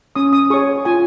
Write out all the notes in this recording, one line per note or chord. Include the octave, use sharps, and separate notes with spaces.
C#4 D#6
D#6
G#4 C#5 C#6
F4 G#5